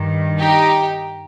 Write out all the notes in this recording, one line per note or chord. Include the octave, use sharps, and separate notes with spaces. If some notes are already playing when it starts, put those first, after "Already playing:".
Already playing: G2 D#3
D#4 G4